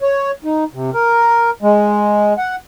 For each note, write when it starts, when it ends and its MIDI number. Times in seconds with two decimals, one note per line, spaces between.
0.02 0.31 73
0.44 0.64 63
0.74 0.90 48
0.94 1.51 70
1.62 2.34 56
2.38 2.56 78